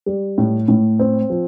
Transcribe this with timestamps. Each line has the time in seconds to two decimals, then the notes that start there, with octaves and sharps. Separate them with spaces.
0.06 G3
0.38 A2
0.68 A2
0.99 C4
1.30 F3